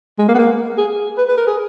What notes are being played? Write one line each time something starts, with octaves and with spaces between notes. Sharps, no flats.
G#3
A#3
B3
A#3
G#4
B4
B4
A#4
G#4